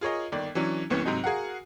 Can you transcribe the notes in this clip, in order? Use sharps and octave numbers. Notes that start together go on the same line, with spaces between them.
F4 G#4 A#4 C#5 D#5
G1 D#3 D5
E3 F#3 C#4 D4
F#1 C2 E3 B3 C#4
G#2 C3 F#3 D#4
F#4 G#4 A#4 F5 F#5